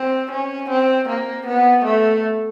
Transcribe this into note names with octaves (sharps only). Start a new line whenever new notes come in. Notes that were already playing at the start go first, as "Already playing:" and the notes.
Already playing: C4
C#4
C4
A#3
B3
A3